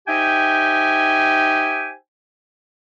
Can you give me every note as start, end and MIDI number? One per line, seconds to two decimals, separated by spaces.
0.08 1.93 63
0.08 1.93 67
0.08 1.93 72
0.08 1.93 76
0.08 1.93 79
0.08 1.93 80